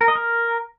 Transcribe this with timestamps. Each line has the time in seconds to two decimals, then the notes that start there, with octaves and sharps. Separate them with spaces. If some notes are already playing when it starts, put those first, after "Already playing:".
0.01 A#4
0.08 D#5
0.15 A#4